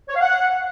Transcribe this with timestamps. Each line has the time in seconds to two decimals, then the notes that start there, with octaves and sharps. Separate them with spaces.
0.08 C#5
0.15 F5
0.21 F#5